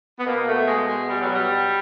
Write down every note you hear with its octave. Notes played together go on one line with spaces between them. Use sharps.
B3
B2 A#3
A3
G#3
G#3
G3
F#3
G3